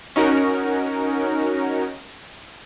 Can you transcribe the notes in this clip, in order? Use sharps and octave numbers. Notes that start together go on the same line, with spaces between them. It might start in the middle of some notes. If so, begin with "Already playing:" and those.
C#4 D#4 F#4 A#4